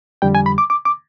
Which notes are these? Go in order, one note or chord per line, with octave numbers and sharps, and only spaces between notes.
F2 D3 G3 G5
G#5
B5
D6
D6
D6